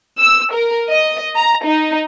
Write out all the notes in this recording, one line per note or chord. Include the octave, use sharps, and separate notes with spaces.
E6
A#4
D#5
A#5
D#4